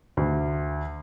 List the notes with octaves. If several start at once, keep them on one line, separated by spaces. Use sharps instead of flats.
D2